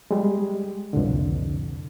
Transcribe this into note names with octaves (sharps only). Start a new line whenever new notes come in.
G3 G#3
C2 F2 A#2 D3